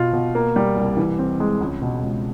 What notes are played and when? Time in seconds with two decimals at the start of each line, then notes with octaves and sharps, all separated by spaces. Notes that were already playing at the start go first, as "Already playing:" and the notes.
Already playing: B2 F4
0.13 B2
0.35 A#3
0.56 G3
0.77 C2
0.97 E3
1.19 C4
1.40 G#3
1.60 C#2
1.82 B2
2.03 C#2